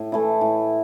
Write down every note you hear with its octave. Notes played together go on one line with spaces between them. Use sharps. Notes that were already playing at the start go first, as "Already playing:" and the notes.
Already playing: A2
E3 A3 E4
A2